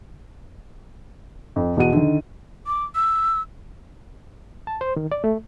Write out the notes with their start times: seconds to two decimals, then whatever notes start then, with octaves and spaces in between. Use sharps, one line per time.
1.56 F2
1.77 E2 B2 F#4 F#5 D#7
1.92 D3 D#3
2.67 D6
2.95 E6
4.67 A5
4.81 C5
4.96 D#3
5.12 D5
5.24 A3